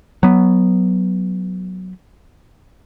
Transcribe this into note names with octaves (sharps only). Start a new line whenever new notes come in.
F#3 B3